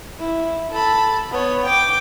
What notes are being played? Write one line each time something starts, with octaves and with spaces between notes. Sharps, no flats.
E4
A4 B5
B3 C#5
G5 D6